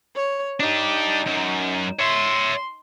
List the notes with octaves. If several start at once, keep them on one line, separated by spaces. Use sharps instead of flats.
C#5
D4 D#4 G4
F#2
C#5 E5 C6